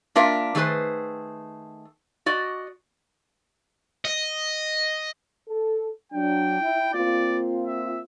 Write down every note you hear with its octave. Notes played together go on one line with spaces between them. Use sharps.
A#3 D4 F4 A#4 E5
D#3 A3 G4 G#4 B4 C5
F#4 D5 D#5
D#5
A4
F#3 D4 G5
E4
A#3 C4 F4 D5
E5